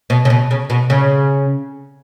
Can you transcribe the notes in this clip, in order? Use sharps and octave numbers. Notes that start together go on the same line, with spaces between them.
B2
C#3
B2
C#3
B2
C#3